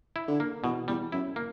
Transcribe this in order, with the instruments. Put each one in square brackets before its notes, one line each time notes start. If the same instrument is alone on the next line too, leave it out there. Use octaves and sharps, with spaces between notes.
[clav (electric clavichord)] E4
[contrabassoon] D3
[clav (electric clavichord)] A#3
[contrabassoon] E2 [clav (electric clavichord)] B2
[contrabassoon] E2 [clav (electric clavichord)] G3
[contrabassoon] F#2 [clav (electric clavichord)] E4
[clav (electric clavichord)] A#3